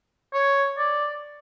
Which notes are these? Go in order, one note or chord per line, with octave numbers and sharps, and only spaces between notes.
C#5
D5